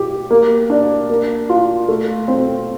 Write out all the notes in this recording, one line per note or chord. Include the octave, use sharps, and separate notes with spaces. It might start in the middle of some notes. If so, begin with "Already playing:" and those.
Already playing: G4
A#3
D4
A#3
F4
A3
C4